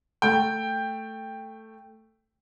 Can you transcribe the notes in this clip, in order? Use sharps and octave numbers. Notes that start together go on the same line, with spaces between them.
A3 G5